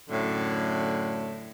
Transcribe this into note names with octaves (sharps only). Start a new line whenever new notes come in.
F#2 A2 D3